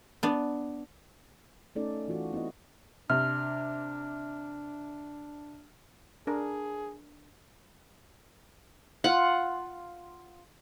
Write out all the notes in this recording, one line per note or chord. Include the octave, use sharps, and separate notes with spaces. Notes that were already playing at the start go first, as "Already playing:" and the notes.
B3 D4
A3 C#4 D#4 A4 D5
E3 F4 F#4
B3 C4 E4 D#5
C3 D4 F6
D4 G#4 A#4
F4 F#5